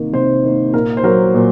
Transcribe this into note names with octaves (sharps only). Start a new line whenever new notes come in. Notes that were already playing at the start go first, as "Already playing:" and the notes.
Already playing: C3 D#3 A#3
C3 C5
D#3 A#3
A#2 A#4
C5
F#3 A#3 A#4
A#2